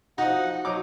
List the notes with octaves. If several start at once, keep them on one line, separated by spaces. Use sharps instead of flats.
F3 D#4 F#4 F#5
F#3 D#4 D6